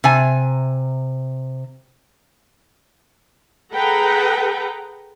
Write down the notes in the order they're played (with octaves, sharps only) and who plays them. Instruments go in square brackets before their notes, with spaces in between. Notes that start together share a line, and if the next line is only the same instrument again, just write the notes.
[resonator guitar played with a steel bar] C3 G#5
[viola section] G#4 A4 B4 F#5 G5 A#5